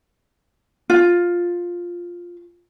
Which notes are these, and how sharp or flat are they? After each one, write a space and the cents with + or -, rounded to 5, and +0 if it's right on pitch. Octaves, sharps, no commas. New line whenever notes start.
F4 +5